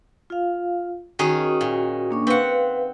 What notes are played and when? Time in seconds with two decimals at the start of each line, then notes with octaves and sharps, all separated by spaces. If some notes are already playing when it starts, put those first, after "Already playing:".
0.30 F4 F5
1.19 D#3 C#4 F#4 G#4
1.61 A#2
2.11 A#3 D4 C#6
2.27 C4 B4 F5 F#5